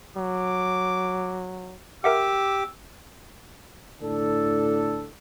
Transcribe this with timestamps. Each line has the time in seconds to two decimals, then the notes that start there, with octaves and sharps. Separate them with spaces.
0.17 F#3 D6
2.04 G4 A#4 E5 F#5 D6 E6
4.02 A2 D3 D4 A4